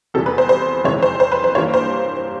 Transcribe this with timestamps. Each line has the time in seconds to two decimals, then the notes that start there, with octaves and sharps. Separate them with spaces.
0.14 E2 C3 E3 G3 A4
0.26 B4
0.38 C5
0.49 C5
0.84 F2 C3 E3 G#3 C#5
1.02 C5
1.20 C5
1.32 B4
1.44 C5
1.55 G2 E3 G3 A#3 C#5
1.74 C5